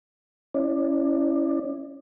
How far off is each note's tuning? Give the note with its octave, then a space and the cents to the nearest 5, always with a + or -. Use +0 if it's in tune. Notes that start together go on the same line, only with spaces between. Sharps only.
C#4 +0 E4 +0 D5 +20